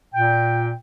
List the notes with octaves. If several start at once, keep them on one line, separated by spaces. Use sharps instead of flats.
A#2 G5